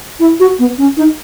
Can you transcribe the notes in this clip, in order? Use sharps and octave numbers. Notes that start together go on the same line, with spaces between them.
E4
F#4
B3
C#4
D#4